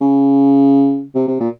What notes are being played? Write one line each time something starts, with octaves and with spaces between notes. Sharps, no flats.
C#3
C3
C3
A#2